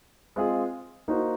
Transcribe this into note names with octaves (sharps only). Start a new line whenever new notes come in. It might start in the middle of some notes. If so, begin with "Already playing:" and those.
G#3 C4 F4 G#4
A#3 D#4 F#4 C5